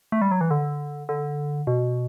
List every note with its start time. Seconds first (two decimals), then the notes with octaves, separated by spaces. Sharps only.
0.12 A3
0.22 G3
0.31 F#3
0.41 E3
0.51 D3
1.09 D3
1.67 B2